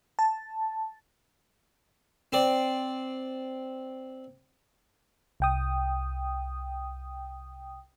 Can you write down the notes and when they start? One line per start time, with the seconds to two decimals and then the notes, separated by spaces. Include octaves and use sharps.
0.19 A5
2.33 C4 D5
5.40 C2 G5 D#6